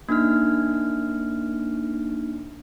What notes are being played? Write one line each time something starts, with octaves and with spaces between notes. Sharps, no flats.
A#3 D4 D#4 F6